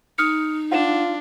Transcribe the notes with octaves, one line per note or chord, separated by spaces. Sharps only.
D#4 D#6 F6 C#7
D4 F4 F#5 E7